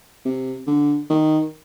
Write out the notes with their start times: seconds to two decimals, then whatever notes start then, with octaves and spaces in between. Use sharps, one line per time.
0.25 C3
0.67 D3
1.10 D#3